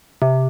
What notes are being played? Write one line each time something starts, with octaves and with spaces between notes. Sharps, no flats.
C3